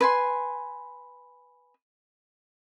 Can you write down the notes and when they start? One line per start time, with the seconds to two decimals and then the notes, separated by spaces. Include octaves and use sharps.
0.01 B4 G#5 C6